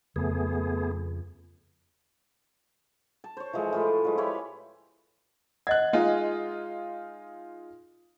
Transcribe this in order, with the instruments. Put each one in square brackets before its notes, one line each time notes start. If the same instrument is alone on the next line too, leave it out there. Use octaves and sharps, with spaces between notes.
[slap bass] F2 C#3 [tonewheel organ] A3 B3 G#4
[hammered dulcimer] A5
C5 C#5
E3 F3 G#3 A4
A2 F4 B4
F3 G#3
E4 G4 C#5 F5
[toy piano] D#5 F#5 [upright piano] F#6 G#6
[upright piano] G#3 D#4 F4